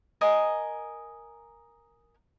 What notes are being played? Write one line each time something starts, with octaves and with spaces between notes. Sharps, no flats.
A#4 D#5 G#5